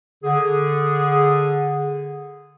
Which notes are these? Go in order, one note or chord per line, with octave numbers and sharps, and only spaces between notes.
D3 G#4